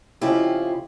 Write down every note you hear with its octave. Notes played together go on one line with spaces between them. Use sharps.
F2 C#3 E4 F4 G4